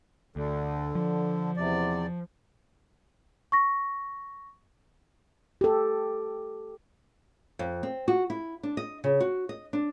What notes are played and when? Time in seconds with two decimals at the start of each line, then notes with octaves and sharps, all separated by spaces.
0.36 D2 D3
0.95 F3
1.57 E2 C3 D5
3.52 C#6 A#6
5.61 G4 A4
7.59 F2
7.83 C4
8.08 F#4
8.30 E4
8.63 D4
8.77 D#5
9.04 C#3
9.20 F#4
9.49 D#5
9.73 D4